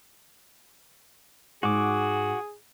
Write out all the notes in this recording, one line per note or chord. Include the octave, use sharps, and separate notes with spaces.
G#2 F#4 G#4 D6